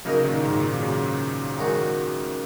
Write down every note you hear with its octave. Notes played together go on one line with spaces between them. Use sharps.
C#3 F#3 A#3 D#4 A#4 D#5
A#2 D#3
G#2 C#3
A#2 D#3
C#3 F#3
D#3 G#3 D#4 F#4